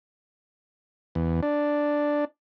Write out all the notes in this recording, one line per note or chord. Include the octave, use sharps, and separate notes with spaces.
E2
D4